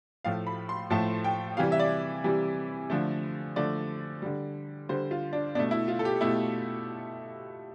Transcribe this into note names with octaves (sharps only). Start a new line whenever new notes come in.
A2 F3 A3 F5
B5
C6
A2 F3 A3 A5
G5
C3 E3 G3 F5
E5
D5
C3 E3 G3
D3 F3 A3
D3 F3 A3 D5
D3 G3
D3 G3 C5
F4
D4
B2 A3 D4
E4
F4
A4
G4
B2 A3 E4